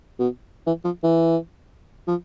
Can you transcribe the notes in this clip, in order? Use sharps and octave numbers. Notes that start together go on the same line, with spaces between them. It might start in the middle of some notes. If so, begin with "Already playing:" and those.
B2
E3
F3
E3
F3